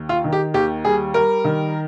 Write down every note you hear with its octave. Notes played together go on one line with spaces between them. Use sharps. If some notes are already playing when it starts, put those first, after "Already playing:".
Already playing: D#2
F4
D#3
G4
D#2 G4
G3 G#4
G3 A#4
D#3